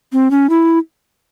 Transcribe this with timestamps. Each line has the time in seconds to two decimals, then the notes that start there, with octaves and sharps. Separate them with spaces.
0.13 C4
0.31 C#4
0.50 E4